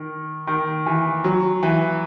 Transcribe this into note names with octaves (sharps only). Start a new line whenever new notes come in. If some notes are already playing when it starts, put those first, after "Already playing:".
Already playing: D#3
D#3
E3
F#3
E3